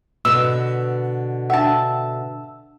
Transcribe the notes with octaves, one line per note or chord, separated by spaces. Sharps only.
B2 D3 E6
D4 E5 F#5 A5